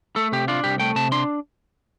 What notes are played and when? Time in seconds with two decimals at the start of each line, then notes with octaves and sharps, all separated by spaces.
0.16 A3 A4
0.32 C3 G4
0.48 D4 F4
0.64 C2 G4
0.80 A3 G5
0.96 C3 A5
1.12 D4 C6